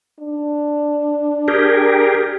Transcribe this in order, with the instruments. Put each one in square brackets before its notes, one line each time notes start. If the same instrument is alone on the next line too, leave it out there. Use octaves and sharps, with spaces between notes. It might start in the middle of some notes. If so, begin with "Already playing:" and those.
[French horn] D4
[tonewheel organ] G4 G#4 A#4